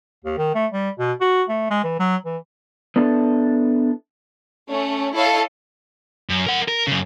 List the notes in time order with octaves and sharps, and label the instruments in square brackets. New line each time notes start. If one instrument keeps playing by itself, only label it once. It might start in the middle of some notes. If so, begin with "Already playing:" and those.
[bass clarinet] D#2
D#3
A3
G3
B2
F#4
A3
G#3
E3
F#3
E3
[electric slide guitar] B3 D4 E4 A4
[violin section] A3 C#4
E4 A4 C#5 D#5 F5
[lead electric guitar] F#2
A#4 F#5
A#4
F#2 C#3